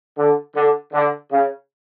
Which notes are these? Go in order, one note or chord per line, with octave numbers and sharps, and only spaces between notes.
D3
D3
D3
C#3